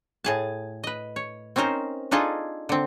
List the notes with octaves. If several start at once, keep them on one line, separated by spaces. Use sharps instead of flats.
A2 G#4 A5
B4 D#5
C#5
C4 C#4 D#4 A#4 C5
D4 D#4 F4 G#4 A4 D#5
D3 C4